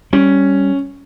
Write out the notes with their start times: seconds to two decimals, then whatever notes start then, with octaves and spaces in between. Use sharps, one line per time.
0.13 G3 C#4